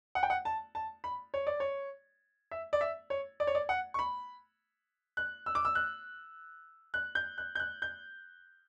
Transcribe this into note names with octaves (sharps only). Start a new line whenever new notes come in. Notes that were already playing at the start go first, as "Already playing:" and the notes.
F#5
G5
F#5
A5
A5
B5
C#5
D5
C#5
E5
D5
E5
C#5
D5
C#5
D5
F#5
C#6
B5
F#6
E6
D6
E6
F#6
F#6
G6
F#6
G6
F#6
G6